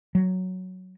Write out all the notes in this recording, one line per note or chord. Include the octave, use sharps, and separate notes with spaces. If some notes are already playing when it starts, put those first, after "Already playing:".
F#3